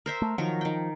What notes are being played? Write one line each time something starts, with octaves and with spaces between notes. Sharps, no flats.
A#4 C5 E5
A3
D#3 F3 F#3 A#4
D#3 G5